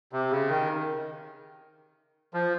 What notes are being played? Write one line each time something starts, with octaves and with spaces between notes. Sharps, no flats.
C3
C#3
D#3
F3